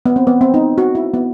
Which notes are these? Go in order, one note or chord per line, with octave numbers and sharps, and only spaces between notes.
B3
C4
B3
C4
D#4
F#4
E4
B3